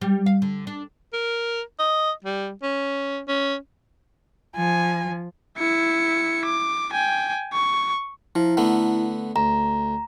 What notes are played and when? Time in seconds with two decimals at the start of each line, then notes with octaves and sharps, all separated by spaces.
0.01 G3
0.26 F5
0.42 D3
0.67 D4
1.13 A#4
1.80 D#5
2.25 G3
2.63 C#4
3.28 C#4
4.56 F3 G#5
5.58 E4 C#7
6.45 D6
6.93 G5 G#5
7.53 C#6
8.35 F3 E4
8.57 D3 A3 B3
9.36 D2 A#5